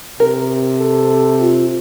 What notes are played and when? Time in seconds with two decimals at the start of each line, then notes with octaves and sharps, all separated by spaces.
0.20 C3 A#4
0.76 A4
1.40 F4